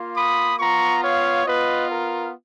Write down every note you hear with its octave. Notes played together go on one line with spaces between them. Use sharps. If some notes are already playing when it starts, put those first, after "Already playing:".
Already playing: A#3 F4
B5 D#6
B3 F4 A#5 C#6
C#5 F5
B3 F4 B4 D#5
A#4